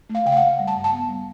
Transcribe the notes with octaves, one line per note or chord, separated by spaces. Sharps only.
A3
F5
C#3 G5
F5
F#5
A3
G3
A5
G2
A5
B3
G3